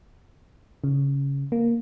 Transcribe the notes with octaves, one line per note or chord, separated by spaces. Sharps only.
C#3
A#3